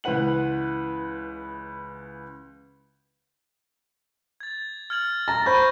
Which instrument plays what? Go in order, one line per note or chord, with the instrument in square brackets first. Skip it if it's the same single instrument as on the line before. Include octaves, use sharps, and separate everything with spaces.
[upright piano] C#2 E3 B4 F#5 F#7
[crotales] G#6 A6
F6 G#6 F#7
[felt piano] A#5 A6 [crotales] A#6
[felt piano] C5 B5 [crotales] C#6 G6 G#6